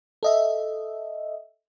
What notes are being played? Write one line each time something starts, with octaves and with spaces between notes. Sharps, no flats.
A4 D#5 E5